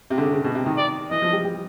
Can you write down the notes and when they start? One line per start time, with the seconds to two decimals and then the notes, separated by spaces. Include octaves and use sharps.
0.10 C3
0.18 D3
0.22 C#3
0.33 C#3
0.44 B2
0.55 C3
0.66 D#3
0.77 D5
1.11 E3 D#5
1.22 F3
1.33 G3
1.44 G3